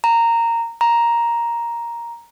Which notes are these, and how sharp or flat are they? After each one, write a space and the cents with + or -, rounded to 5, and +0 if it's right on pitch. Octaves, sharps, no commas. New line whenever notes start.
A#5 -15
A#5 +5